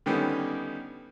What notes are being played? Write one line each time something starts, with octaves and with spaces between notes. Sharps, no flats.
D3 D#3 G3 B3 C#4